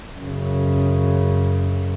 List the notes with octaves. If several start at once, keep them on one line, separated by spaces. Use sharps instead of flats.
F#2 C#3